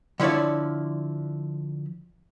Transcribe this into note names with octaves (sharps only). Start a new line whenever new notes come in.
D3 F3 E4 C#5 D5